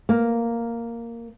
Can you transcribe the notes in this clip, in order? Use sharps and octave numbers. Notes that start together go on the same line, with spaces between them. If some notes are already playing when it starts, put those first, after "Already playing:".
A#3